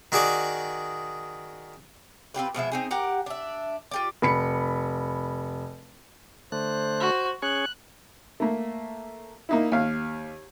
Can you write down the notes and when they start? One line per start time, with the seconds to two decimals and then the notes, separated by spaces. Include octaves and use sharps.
0.12 D#3 F#4 G#4 D5
2.34 C4 F4 G4 B4
2.54 B2 F3 G#3 E5
2.72 C4 D#4 G#4
2.91 G4 A#4 F#5
3.26 D4 E5
3.91 F4 G4 D5
4.22 F1 B5 C#7
6.52 D3 A3 C5 F#6
7.01 F#4
7.42 C#4 G#4 C#5 F#6
8.40 A3 A#3
9.49 A#3 D#4 E4
9.72 D#2 F5